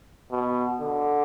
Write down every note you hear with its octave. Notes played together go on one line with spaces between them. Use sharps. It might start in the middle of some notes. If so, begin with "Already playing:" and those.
B2
D3